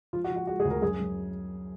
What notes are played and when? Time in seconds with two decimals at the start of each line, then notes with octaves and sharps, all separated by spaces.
0.13 F3 F4
0.24 F#4
0.30 F3
0.36 F#4
0.47 G#3 F#4
0.60 G#4
0.65 D2
0.71 A#4
0.82 F#2 G#4
1.00 F#2